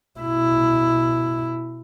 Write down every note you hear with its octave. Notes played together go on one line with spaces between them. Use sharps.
B2 E4